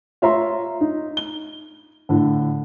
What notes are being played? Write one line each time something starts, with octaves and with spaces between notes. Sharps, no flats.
F4 C#5 E5 F5 A#5 C6
D#4
G7
A2 D3